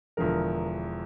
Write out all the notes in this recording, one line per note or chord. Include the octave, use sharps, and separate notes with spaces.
E1 E2 D3 F3 A#4